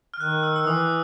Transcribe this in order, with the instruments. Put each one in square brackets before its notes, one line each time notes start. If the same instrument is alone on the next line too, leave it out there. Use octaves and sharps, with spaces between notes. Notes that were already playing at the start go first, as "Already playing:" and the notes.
[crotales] F6
[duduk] D#3 [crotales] F#6
[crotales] E6
E6
[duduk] E3 [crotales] D#6